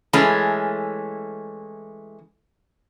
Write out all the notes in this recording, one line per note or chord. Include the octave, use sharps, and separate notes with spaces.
E3 G#3 A3 C#4